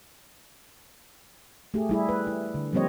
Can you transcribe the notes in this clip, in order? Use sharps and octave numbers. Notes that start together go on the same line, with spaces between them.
A3 G4 G#4
G3 E4 G#4
B4
E4
D3
F3 G3 A#3 C4 C#5 D#5